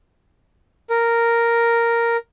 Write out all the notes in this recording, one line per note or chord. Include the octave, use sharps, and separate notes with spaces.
A#4